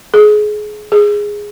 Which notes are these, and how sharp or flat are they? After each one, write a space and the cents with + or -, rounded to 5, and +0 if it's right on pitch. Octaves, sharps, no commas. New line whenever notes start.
G#4 +25
G#4 -5